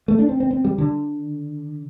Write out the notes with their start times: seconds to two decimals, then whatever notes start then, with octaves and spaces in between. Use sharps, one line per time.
0.08 A3
0.19 D4
0.29 C4
0.40 C4
0.51 C4
0.65 G3
0.78 D3